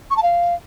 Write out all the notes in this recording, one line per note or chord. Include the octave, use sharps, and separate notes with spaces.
C#6
A5
F5